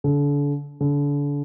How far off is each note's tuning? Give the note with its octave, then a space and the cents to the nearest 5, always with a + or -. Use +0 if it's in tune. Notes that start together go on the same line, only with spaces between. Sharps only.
D3 -35
D3 -35